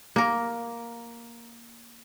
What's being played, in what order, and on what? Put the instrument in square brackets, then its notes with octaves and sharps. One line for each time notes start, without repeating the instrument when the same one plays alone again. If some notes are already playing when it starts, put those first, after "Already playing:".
[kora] A#3 A#4